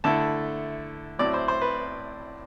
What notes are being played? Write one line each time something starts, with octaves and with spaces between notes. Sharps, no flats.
D3 A3 E4 A5
A2 F#3 C4 E4 D5
C5
C5
B4